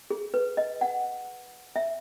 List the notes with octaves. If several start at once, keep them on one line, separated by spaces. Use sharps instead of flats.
G#4
B4
D#5
F#5
E5